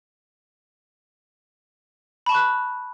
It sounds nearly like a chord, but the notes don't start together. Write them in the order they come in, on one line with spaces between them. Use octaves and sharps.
B5 A5 C#6 F#6